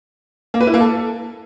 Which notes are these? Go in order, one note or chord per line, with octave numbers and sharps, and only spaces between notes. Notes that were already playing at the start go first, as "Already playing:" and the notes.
A#3
B4
E4
A#3
A4